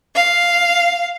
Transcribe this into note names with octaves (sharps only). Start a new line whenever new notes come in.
F5